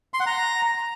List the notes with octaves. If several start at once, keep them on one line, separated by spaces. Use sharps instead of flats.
C6
F#5
A#5